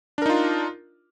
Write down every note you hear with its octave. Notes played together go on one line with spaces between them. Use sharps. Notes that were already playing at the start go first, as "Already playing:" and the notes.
D4 D#4 F4 A#4